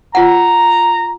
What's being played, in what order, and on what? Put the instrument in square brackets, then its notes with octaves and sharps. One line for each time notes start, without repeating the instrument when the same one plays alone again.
[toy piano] F4 F#5 [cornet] A#5